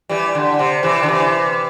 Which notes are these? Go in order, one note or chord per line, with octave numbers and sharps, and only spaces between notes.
E3 G3
D3
C3
C3 E3
D3
C3 E3